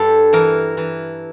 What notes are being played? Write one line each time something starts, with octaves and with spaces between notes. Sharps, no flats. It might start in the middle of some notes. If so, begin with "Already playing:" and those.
Already playing: G2 G4 A4
E3 A#4
E3